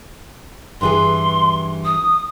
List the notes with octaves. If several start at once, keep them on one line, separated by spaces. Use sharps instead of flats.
G2 E3 G#4 C6
D#6